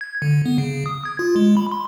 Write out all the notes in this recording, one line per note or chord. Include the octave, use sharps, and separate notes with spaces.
G#6
D3
B3
C#3
D#6
G#6
F4
G#3
B5
C6